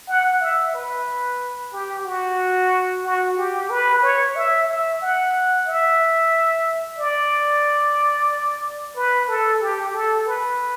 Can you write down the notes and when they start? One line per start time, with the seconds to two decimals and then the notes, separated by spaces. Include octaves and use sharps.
0.08 F#5
0.41 E5
0.74 B4
1.73 G4
2.05 F#4
3.04 F#4
3.37 G4
3.70 B4
4.03 C#5
4.36 E5
4.68 E5
5.02 F#5
5.67 E5
6.98 D5
8.96 B4
9.29 A4
9.61 G4
9.94 A4
10.27 B4